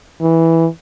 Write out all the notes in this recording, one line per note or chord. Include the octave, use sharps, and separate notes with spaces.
E3